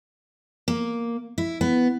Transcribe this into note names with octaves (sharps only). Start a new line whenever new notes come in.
A#3
E4
B3